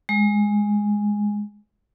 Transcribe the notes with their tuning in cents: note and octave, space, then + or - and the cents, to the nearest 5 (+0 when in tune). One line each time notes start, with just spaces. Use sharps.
G#3 -5